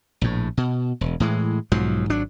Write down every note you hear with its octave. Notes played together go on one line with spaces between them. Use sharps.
A#1 A2
B2
E1
A2 E3 G#3
B1 G#2 F3 F#3
G#1 F#3 D4